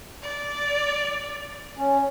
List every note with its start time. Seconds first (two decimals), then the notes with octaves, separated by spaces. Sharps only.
0.22 D5
1.78 C#4